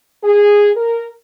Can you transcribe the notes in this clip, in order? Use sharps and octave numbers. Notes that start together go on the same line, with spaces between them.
G#4
A#4